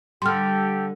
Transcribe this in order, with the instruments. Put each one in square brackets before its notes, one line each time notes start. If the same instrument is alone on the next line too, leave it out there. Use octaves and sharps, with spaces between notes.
[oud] D3 G3 [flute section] G4 A4 [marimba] C6 F6